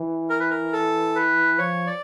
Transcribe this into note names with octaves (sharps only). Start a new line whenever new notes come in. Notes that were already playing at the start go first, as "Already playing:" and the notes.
Already playing: E3
A#4
B4
A#4
A4
B4
F3 C#5
D5